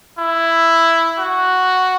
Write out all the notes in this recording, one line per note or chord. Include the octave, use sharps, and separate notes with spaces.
E4
F#4